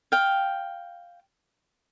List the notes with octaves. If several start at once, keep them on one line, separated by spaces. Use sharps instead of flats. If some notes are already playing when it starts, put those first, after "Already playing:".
F5 G5